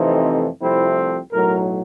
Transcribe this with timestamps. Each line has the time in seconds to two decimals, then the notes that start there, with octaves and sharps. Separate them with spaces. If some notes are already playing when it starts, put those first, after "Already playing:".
Already playing: F2 C3 E3 A3 C4 D#4
0.62 C2 C3 F3 A3 C4 E4
1.32 B1 A2 F#3 A#4